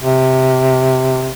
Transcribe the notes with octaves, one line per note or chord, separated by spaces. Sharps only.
C3